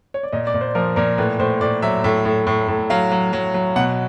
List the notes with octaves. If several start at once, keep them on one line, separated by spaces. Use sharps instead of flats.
C#5
D5
A#2 D#5
D5
A#2
C5
F3 A#4
A#2 A#4
A2 B4
A2 C5
A2 D5
F#3 E5
A2 E5
A2
A2
A2
F#3 F5
F#3
F#3
F#3
B2 F#5